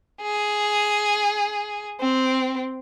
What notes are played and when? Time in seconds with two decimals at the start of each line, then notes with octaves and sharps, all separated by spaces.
0.22 G#4
2.00 C4